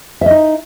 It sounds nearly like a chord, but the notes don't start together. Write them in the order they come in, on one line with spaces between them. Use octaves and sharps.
E5 D#5 D#4